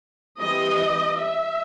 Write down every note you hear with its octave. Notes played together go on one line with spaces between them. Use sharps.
E3 G3 C4 D#5
E5